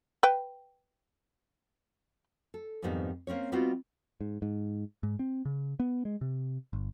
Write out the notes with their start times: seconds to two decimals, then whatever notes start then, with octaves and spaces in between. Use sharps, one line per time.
0.23 B4 G5
2.54 A4
2.82 F2 G#2 D#3 G3 B3 D#4
3.27 A#3 C4 C#4 C#5
3.52 G3 B3 C4 D#4 F4 F#4
4.21 G#2
4.42 G#2
5.03 G#2
5.19 C4
5.45 C#3
5.80 B3
6.05 G#3
6.21 C3
6.73 G1